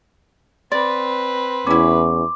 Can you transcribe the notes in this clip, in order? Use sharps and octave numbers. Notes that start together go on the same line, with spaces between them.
C4 B4 D5 C6
E2 C#4 E4 D6